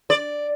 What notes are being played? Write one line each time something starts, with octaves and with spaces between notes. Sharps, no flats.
D5